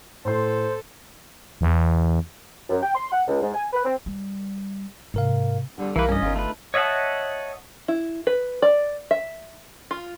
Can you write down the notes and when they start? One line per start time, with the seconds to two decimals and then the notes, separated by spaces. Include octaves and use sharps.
0.25 A2 A4 C5 C6
1.61 E2
2.69 F#2
2.83 G5
2.95 C6
3.12 F#5
3.28 C#2
3.42 G#2
3.55 G#5
3.73 B4
3.85 C4
4.06 G3
5.14 G#2 C3 A#4 F5
5.78 E2 G2 D3 G3
5.96 B1 E3 A#3 B4
6.09 G2 E3 A3 C#4 D#5
6.22 G1 E2 D#4 F4 A#4
6.36 D3 A3 B4
6.74 C#5 D#5 E5 F#5 A5
7.88 E4
8.27 B4
8.62 D5
9.11 E5
9.91 F4